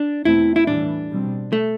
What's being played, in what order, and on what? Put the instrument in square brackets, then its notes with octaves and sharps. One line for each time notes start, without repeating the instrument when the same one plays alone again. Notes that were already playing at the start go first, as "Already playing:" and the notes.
Already playing: [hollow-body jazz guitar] D4
[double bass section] E2 B2 A3 C4 [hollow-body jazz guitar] E4
[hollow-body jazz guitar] E4
[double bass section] A2 E3 G3 [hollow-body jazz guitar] D4
[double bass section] B2 G3 C4
[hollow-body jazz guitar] A3